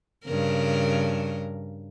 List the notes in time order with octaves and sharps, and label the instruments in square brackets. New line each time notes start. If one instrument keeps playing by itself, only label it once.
[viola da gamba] G2 C#3 A#4